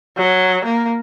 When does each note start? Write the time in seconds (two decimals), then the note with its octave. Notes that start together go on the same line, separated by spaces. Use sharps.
0.17 F#3
0.65 A#3